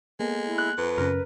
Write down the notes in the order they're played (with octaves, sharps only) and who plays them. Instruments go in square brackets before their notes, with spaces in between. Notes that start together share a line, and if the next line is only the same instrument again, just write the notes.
[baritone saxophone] G#3 [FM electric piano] A#3 B3 A4
[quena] E4
[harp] F#6
[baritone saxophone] F2 [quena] B4
[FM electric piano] F#2 C#3 C#4 [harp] A#4